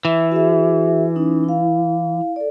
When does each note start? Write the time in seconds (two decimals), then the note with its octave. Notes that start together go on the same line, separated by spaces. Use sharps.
0.05 E3 E5
0.32 F#4 G#4 E5
1.16 C#4 D#4
1.44 E4 F5
2.36 A4 D5